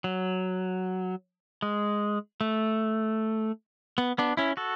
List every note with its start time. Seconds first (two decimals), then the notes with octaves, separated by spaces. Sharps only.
0.04 F#3
1.62 G#3
2.41 A3
3.98 B3
4.18 B3 D4
4.37 C#4 E4
4.57 F#4 A4